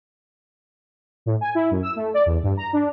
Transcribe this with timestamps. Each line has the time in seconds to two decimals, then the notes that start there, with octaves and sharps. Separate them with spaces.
1.26 A2
1.41 G#5
1.55 E4
1.71 F#2
1.83 E6
1.96 A3
2.14 D5
2.26 E2
2.43 G2
2.57 A#5
2.73 D4